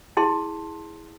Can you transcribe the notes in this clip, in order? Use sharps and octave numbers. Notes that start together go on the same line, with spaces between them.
E4 G#4 A5 C6